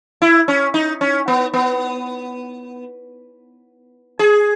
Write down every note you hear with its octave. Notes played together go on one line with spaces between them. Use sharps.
E4
C#4
D#4
C#4
B3
B3
G#4